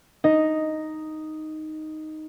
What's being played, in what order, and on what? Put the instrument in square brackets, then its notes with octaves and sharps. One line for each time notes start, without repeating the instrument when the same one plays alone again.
[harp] D#4 [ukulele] D#5